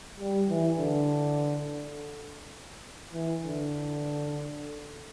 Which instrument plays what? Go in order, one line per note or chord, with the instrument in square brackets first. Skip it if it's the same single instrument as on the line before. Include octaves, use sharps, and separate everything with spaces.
[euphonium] G3
E3
D3
E3
D3